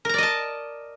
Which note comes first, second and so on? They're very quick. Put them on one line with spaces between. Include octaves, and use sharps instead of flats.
A#4 A#5 D5 D#5 A5